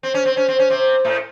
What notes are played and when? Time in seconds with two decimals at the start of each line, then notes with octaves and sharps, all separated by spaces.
0.03 C4
0.14 C#4
0.25 C4
0.37 C#4
0.48 C4
0.59 C#4
0.70 C3 C4
1.04 A2 A3